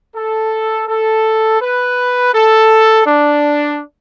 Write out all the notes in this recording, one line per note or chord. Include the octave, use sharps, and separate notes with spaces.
A4
A4
B4
A4
D4